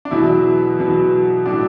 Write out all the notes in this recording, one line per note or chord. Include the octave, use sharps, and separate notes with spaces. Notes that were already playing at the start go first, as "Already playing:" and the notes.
D4
E2 B2 F#3 E4
E2 B2 F#3
A2 F#3 D4